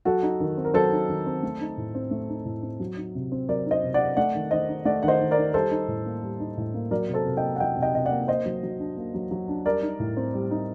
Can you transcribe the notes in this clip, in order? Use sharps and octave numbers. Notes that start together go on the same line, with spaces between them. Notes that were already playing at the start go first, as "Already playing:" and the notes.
F#3 F#4 A4
D#4
D#3
C4
A#4
F#3 A4 C5
D#4
D#3
C4
A3
D#4
A2
C4
A3
D#4
A2
C4
F#3
D#4
C3
C4
F#3 A#4 D5
D#4
C5 D#5
C3
D5 F#5
C4
A3 D5 F#5
D#3
D#3 C5 D#5
D#4
A3 D5 F#5
D#3 F#5
C5 D#5
D#3
A#4 D5
D#4
G3 A4 C5
D#4
A2
A#3
G3
D#4
A2
A#3
F#3 A#4 D5
C3
A4 C5
C3
D#5 G5
A#3
F#5
F#3 D#5 G5
C3
D#5 G5
C3 D#5
D5 F#5
A#3
A#3 C5 D#5
F#3
F#3
D4
A#3
F#3
F#3
D4
G3 A#4 D5
D#4
A2
C4
G3
D#4